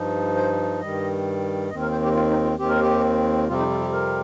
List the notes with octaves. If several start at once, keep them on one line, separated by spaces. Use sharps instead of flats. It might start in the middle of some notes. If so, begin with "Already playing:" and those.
Already playing: G2 F3 D#4
C5
G2 D#3 G3 D#5
D#2 D#3 C4 D#5
A#4
C5
G4
F4
D#4
F4
D#2 D#3 C4 G4
A#4
G4
F2 C3 G3 C4 F4
D#4
F4
G4
A#4